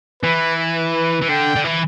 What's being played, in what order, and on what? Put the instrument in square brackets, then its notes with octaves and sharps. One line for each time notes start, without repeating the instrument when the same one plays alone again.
[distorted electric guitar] E3 [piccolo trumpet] B4
[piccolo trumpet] B4
[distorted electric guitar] E3
[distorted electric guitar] D3 [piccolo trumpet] G5
[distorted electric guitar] D3
E3